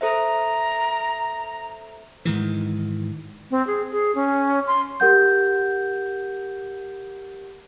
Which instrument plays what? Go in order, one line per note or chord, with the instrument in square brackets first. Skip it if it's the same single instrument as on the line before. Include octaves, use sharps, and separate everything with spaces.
[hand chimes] A4 C5 E5 [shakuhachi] A#5
[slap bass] G#2 D#3 E3
[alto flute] C4
G#4
G#4
C#4
C6
[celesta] G4 A#4 F#5 G6